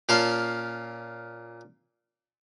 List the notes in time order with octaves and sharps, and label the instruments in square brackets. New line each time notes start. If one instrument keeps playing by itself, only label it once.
[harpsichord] A#2 C#4 F5 A5 C6